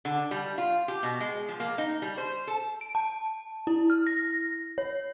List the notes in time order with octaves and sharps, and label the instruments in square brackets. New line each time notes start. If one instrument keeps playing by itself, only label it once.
[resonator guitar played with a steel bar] D3
G3
F4
G4
B2
G#3
F3
A#3
D#4
G3
C5
A4
[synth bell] D7
A5
E4
F6
A#6
C#5